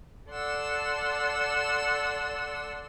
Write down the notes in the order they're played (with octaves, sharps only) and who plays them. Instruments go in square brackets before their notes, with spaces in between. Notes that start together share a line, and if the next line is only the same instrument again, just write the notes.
[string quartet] A4 D5 F#5 C6 E6